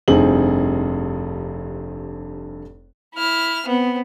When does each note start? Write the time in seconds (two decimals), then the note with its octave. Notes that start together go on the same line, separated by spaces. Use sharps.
0.08 F1 G2 C4 D#4 G#4 F#7
3.15 E4 F6
3.66 B3 C4